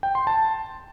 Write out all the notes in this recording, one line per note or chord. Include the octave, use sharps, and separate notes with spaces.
G5
C6
A5